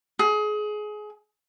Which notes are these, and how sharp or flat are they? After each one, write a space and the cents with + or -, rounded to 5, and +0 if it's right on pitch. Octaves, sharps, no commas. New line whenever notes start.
G#4 +25